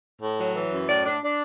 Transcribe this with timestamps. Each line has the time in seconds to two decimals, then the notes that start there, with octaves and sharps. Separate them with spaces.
0.22 A2
0.39 F#3
0.55 E3
0.72 F#2
0.88 A2 D5
1.05 D4
1.22 D4